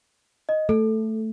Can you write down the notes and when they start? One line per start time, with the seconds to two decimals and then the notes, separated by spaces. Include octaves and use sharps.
0.49 D#5
0.69 A3 A4